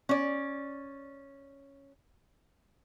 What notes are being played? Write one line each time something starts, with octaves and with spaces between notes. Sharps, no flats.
C#4 D5